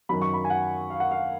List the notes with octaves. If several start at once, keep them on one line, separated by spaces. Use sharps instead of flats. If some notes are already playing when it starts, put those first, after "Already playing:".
F#2 D#3 F#3 B5
C#6
B5
G#5
F#5
F5
F#5
F5